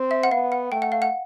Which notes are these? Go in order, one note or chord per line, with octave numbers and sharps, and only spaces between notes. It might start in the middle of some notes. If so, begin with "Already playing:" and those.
Already playing: C4
E5
F#5
B3 F5
F#5
A3 G5
F#5
F5
F#5